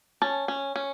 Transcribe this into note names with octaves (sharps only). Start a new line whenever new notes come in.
C#4 A5
C#4
C#4